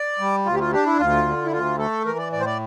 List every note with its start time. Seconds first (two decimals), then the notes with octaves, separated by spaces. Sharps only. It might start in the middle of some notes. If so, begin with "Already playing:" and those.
Already playing: D5
0.19 G3
0.46 D2 F4
0.54 G4
0.59 F4
0.72 D4 G4
0.86 E4
0.99 D2 F4
1.26 D3
1.44 E4
1.52 D2 F4
1.79 A3 A4
2.06 E3 A#4
2.18 D5
2.32 A2 D5
2.40 C5
2.46 D5